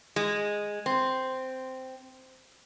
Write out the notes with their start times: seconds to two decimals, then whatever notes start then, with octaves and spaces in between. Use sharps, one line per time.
0.16 G#3
0.86 C4